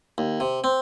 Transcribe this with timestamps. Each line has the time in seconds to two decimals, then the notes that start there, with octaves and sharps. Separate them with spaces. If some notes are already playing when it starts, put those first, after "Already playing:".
0.18 D#2
0.40 C3
0.64 C4